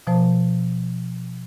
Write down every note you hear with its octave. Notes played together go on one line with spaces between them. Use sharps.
B2 F3 C5 A5